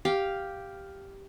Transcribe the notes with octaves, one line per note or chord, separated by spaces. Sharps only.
G4 F5 G5